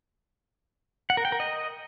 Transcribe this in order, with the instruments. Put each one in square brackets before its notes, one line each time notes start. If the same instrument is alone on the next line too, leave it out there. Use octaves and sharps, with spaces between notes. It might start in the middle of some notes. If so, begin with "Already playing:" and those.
[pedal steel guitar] F#5
A#4
G5
A#4
D#5